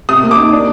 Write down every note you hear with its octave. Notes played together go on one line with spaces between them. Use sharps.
C3 D#6
A#3
D6
D#4
D4